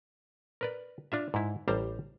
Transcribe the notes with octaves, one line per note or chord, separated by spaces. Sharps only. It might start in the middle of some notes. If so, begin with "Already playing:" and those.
A#4 B4 D5
D4 F4 E5
G#2 E4
A1 G3 C5 G5 A5 A#5